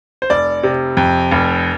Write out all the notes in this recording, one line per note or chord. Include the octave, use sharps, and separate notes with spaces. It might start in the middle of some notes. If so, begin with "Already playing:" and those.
C5
F1 D5
C3
F2
F1